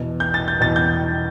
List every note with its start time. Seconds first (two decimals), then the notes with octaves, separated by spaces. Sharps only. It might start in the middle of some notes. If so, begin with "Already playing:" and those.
Already playing: E2 B2
0.20 G6
0.34 A6
0.48 G6
0.60 E2 B2 A6
0.76 G6